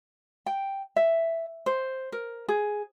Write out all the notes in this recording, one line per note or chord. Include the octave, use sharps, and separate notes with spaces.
G5
E5
C5
A#4
G#4